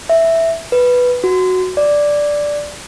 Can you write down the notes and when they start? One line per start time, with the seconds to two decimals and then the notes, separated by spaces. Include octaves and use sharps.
0.09 E5
0.72 B4
1.24 F#4
1.77 D5